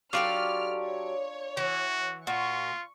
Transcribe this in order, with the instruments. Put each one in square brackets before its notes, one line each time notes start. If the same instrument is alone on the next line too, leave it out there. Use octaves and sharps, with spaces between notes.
[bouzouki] F#3 G4 A4 [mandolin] D4 F4 D5 [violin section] F6
[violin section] C#5
[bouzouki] E3 [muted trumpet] F#4
[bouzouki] A#2 [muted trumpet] F4 [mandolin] F#4 [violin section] C#6